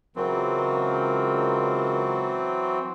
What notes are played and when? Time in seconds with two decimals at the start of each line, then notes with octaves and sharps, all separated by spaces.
0.16 C#2 E3 F#3 C4 A#4